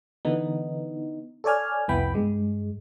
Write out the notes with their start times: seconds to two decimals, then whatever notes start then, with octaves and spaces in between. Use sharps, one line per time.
0.25 D3 E3 B3 D#4
1.44 A4 C#5 D5 G#5 F6
1.88 C2 F2 B3 E4 G5 B5
2.14 G2 G#3